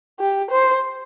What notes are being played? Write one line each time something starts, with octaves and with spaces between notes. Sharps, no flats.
G4
C5